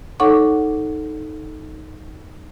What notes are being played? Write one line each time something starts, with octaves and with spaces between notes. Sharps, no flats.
D#4 A4 C#5 F#5 C#6 D6